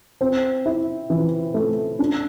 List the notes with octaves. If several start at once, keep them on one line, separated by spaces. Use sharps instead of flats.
C4
E4
E3
A3
D4